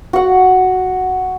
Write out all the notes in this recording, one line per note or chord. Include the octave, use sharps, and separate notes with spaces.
F#4 F#5